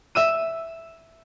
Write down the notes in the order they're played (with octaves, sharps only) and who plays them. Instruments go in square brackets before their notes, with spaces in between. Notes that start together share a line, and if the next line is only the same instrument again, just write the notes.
[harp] E5 E6 D#7